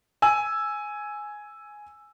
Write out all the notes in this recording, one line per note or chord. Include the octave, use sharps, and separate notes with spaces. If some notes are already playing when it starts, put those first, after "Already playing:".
G#5 E6